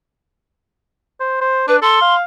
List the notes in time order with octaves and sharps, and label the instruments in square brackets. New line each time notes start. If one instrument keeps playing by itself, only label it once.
[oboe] C5
C5
[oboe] D4 [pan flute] B4
[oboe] A4 [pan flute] C6
[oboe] F5